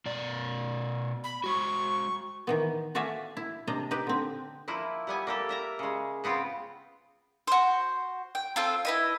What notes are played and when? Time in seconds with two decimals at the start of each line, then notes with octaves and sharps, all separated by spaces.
0.06 B2 D5
1.24 B5
1.44 G#3 F#4 C#6
2.47 D#3 E3 B3
2.95 A3 F#4 D5 E5 F5 G#5
3.37 E4
3.67 C3 D4 D#5 A#5
3.91 D#4 G4 B4
4.07 D3 C4
4.68 F3 A#3 E4
5.07 G3 B3 G#5
5.27 A#3 G4 A4
5.49 A#4 E5 A#5
5.79 C#3 G#3
6.24 C#3 B3 C4 F4 G5
7.47 F#4 C5
8.35 G5
8.56 C4 F4 A4
8.85 E4 B4 D#5